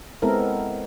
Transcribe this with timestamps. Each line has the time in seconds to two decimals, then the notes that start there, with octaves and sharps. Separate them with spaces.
0.22 G#3 B3 C4 E4 A4 A#4